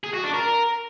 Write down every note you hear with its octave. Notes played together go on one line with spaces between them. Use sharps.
G#4
F#4
D4
A#4